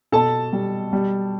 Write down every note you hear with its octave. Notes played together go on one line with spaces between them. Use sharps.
B2 A4 A5
G3
G3